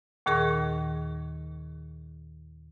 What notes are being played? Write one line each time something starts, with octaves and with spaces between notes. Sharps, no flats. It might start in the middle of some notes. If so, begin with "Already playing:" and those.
D#2 A#2 D#3 G#4 A#4 C#6